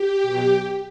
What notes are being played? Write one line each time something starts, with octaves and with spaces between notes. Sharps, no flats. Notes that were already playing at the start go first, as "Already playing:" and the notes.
Already playing: G4
B2 F#3